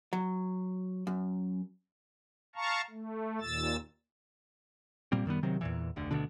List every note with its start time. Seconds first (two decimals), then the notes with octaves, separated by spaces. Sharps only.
0.13 F#3
1.07 F#2
2.56 F5 A5 A#5 C#6
2.90 A3
3.41 D#2 A#2 E6 A6
5.12 A#2 G3 A#3 C4
5.25 F#2 D#3 G3 B3
5.43 C3 D#3 F#3 C4
5.61 E2 A#2 E3
5.96 F1 D2 D3
6.11 D2 B2 D3 D4